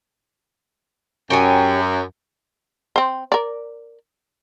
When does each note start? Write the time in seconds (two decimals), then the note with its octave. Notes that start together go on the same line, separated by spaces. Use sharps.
1.30 F#2 G4 C#5 G#5
2.96 C4 C5
3.32 A#4 D5